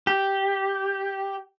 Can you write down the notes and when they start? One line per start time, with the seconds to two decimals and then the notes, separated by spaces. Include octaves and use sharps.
0.07 G4